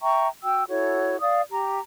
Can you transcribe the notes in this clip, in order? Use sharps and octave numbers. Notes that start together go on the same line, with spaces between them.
E5 G5 A#5 C#6
F#4 G5 E6
E4 F#4 A4 C#5
D5 F5 D#6
G4 A#5